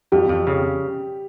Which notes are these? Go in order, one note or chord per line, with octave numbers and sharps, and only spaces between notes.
F2 G3 G4
F2
C#3